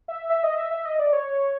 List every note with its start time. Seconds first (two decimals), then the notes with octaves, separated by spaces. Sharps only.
0.08 E5
0.30 E5
0.43 D#5
0.58 E5
0.71 E5
0.85 D#5
0.99 D5
1.13 C#5